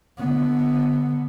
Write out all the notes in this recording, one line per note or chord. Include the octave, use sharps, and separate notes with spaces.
D3 B3